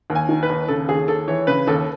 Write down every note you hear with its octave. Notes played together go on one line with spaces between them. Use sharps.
D#2
G#5
D#3
B4
D#2
C#3 A4
D#2 G#4
D#2 A4
E3 C#5
C#3 B4
D#2 A4